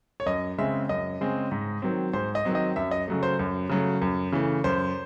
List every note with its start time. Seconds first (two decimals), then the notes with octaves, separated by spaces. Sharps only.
0.20 C#5
0.26 F#2 D#5
0.58 C#3 G#3 C4 E5
0.89 F#2 D#5
1.21 C#3 G#3 C4
1.51 G#2
1.82 D#3 F#3 C4
2.13 G#2 C5
2.35 D#5
2.45 D#3 F#3 C4
2.55 D#5
2.76 F#2 E5
2.91 D#5
3.08 C#3 F#3 A3
3.23 C5
3.39 F#2
3.69 C#3 F#3 A3
4.02 F#2
4.32 C#3 E3 A3
4.64 F#2 C5